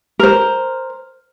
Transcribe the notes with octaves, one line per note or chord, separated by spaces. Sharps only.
A#4 C5